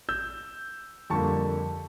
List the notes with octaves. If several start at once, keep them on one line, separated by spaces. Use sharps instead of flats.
E6 G6
F2 D3 G3 A#3 A5 C#6